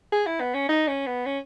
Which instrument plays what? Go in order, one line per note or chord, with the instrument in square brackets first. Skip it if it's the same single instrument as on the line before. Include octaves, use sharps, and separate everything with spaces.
[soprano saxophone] G#4
E4
B3
C#4
D#4
C#4
B3
C#4